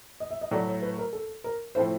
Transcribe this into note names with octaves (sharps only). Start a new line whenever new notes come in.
D#5
E5
D#5
A2 F#3 A3 D5
C#5
B4
A#4
A4
A#4
A2 F3 A3 C4 E4 C5